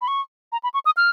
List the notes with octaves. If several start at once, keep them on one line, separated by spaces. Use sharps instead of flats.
B5
C#6
A#5
B5
C#6
D#6
F6